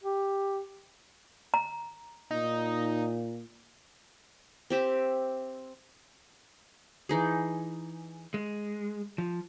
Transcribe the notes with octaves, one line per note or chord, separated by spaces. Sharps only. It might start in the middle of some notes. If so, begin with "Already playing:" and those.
G4
A#5
A#2 D#4
C4 G4 E5
E3 D#4 G#4
G#3
F3